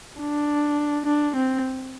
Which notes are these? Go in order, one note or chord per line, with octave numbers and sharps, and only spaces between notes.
D4
D4
C4